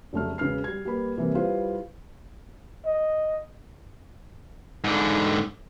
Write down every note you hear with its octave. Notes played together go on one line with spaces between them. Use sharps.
F1 C#3 F#3 A3 E5 F6
E1 C#3 B4 F6 C7
G3 G#6
G3 A#3 B4 B5
C3 E3 G3 A#3 E4
G3 E4 F4 B4 C5 F5
D#5
G#2 D3